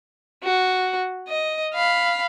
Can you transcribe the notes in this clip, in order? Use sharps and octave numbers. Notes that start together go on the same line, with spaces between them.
F#4
D#5
F5 B5